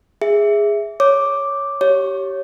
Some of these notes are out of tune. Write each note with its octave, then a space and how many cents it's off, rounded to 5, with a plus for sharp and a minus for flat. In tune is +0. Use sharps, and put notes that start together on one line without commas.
G#4 -10 E5 +0
C#5 +0 D6 +0
G4 -20 C#5 +0